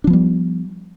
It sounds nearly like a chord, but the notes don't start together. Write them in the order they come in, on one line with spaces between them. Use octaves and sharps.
D4 F3 B3 G3